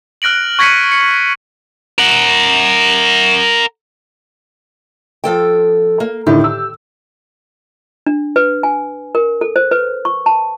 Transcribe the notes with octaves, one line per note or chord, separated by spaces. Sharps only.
F6 F#6 A#6 D7 F#7
C#6 G#6 A#6 B6 C#7 D#7
C#7
A#4 F#5
F3 A4 G5
A#3
A2 D3 D#3 G4
E6
D4
B4
G#5
A#4
A4
C5
B4
C#6
A5